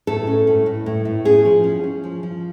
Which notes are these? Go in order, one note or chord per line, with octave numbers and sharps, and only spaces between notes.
A2 A4
C#4
A2
A2
A2
A2
C#4 G#4
F3
C#4
C#4
F3
F3